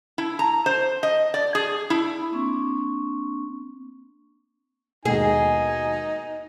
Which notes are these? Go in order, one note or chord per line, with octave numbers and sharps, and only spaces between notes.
E4
A#5
C5
D#5
D5
G#4
E4
A#3 C4 D4 C#6
D#2 G#2 B2 D#4 G#4 G#5